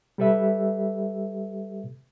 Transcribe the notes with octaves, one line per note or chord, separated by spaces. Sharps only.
G3 G4 A4 B4 E5